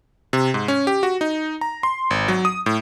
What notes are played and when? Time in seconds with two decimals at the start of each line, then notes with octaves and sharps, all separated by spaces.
0.33 C3
0.54 G#2
0.68 C#4
0.87 G4
1.03 F#4
1.21 D#4
1.61 A#5
1.83 C6
2.10 G#1
2.28 F#3
2.45 D#6
2.66 A2